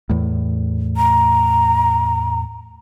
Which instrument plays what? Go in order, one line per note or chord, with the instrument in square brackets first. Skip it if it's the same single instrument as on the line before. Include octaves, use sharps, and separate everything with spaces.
[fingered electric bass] E2 A2
[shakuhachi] A#5